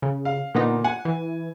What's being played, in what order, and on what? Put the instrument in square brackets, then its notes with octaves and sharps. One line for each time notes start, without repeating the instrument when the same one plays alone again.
[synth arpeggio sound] C#3
[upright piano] F5
[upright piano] A#2 [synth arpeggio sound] D3 B3 D#4
[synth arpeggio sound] F#5 [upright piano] G#5
[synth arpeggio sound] E3